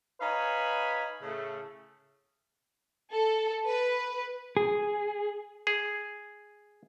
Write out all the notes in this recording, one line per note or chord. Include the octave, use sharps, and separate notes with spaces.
D#4 B4 C#5 F5 G#5 B5
A2 C#3 A3
A4
B4
G#4
G#4